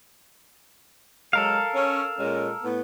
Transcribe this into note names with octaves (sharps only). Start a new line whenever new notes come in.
F#3 G#3 A4 A#4 F5
C#4
A#2 G#3 C#4
A2 B3